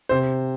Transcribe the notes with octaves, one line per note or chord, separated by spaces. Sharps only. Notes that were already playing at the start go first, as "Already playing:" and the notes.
C3 C5